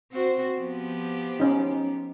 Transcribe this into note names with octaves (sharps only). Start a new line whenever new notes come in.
C4 F#4 C5
F3 B3 G4
C#4 D#4